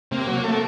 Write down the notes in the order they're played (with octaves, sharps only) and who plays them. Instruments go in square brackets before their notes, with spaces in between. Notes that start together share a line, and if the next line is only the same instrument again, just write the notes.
[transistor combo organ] C3 [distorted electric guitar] A#3
[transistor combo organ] F#3
A3